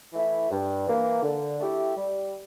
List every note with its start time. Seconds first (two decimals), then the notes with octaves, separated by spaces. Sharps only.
0.13 E3 A3 E4
0.50 G2
0.87 E3 A#3
1.23 D3
1.60 A3 E4 G4
1.96 G3